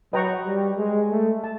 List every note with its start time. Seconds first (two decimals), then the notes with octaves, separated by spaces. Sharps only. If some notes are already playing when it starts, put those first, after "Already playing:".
0.13 F#3 B4 D#5 G5 A#5 C#6
0.46 G3
0.78 G#3
1.11 A3
1.44 A5